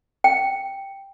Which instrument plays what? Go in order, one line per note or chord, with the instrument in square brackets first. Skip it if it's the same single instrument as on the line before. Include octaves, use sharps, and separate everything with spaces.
[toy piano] G5